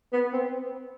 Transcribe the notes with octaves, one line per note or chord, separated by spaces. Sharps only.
B3
C4